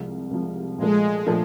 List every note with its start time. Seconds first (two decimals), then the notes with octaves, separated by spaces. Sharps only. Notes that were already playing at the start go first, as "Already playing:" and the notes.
Already playing: C2 C3 F3 G#3
0.31 C2 C3 F3 G#3
0.79 A#2 F3 G#3 A3
1.27 A#2 F3 A3